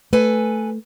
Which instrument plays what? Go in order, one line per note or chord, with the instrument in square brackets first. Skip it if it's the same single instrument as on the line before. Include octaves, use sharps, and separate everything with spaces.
[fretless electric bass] A3 [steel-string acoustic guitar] A4 B4 G#5